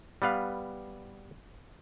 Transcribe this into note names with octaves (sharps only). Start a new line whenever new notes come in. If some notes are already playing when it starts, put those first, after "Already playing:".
G3 B3 B4 F5